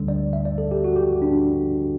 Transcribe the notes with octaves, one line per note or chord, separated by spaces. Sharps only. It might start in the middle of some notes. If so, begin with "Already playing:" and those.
Already playing: D2 D3 G3
D5
E5
D5
A4
G4
F#4
G4
F#4
D4